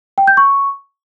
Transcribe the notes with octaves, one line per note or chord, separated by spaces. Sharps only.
G5
G6
C#6